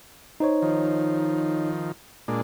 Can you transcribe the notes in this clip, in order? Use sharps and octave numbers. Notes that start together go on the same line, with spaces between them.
D#4 C5 C#5
D#3 F3
A#2 G#3 D4